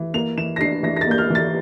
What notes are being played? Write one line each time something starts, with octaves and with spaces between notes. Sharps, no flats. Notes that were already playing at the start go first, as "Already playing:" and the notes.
Already playing: E3
A#3 F7
E3 E7
A#6
D4 C7
E3 A#6
A#6
A6
A#3 G6
F6
E3 A6